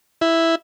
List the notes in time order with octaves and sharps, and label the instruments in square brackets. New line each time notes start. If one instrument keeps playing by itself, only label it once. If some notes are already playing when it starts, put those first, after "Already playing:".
[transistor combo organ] E4